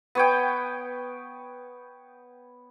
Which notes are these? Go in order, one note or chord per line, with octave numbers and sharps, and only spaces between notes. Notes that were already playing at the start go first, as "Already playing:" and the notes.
B3 C#5 G5